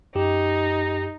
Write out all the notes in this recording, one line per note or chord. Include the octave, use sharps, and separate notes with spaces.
F#2 D#4 G4